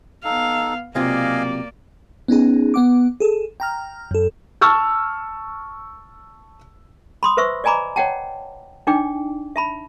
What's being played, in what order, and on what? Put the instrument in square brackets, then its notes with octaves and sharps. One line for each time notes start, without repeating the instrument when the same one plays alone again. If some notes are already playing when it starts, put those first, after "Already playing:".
[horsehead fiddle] B3 F5 [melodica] D#4 A4
[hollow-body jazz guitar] B1 C3 F4 [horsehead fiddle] A#3 D5 [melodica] D#5 F5 G#5
[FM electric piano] B3 C#4 D#4 G#4
B3 F#5 D6
G#4 A4
G5 A#5 F6
F#2 A4
[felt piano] A5 C#6 E6 F6
[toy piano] B5 C6 D#6
B4 C5 E5 C#6 E6
D5 D#5 G#5 A#5 B5 D6
C#5 D#5 F#5 G5 A5
D4 D#4 D5 G5 D6
E5 A5 B5